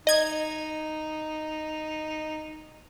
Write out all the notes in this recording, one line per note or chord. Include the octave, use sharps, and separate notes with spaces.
D#4 D#5 G#6